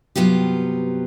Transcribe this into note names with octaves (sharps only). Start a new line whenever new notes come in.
G2 C3 F#3 B3 F4 G4